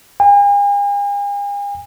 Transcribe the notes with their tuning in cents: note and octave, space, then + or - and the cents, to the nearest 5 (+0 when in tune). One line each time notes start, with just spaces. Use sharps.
G#5 -45